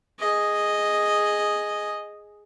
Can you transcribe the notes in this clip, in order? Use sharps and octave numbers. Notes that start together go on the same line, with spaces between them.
G#4 D#5